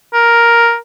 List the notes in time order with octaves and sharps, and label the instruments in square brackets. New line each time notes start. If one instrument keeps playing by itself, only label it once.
[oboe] A#4